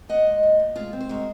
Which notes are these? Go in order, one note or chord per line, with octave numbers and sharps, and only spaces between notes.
A#2 D#5 F#5
G#3
A#2
A#2
G#3 F4 G#4
C4
C5
G#3 F#4 A#4